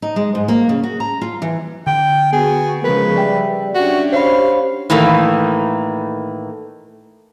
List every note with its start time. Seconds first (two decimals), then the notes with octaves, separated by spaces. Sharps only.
0.02 D#4
0.16 G#3
0.35 G#2
0.48 A#3
0.69 C#3
0.83 F#4
1.00 A#5
1.22 F4
1.42 E3
1.87 D3 G5
2.32 B3 F#4 G#4
2.84 C#3 F3 G#3 A#4 B4
3.16 G3 D5 E5 G5
3.75 C#4 D4 F#4 G4
4.12 C5 C#5 F5 B5
4.90 A2 D#3 E3 A3 A#3